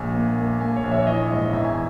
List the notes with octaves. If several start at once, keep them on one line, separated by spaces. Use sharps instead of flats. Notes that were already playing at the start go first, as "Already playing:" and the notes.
Already playing: A#1 G#5
A#3
A#3
A#3 G#5
C#5
A#1
E5
C#5
E3 D#5
G#2
E2 E5
G#5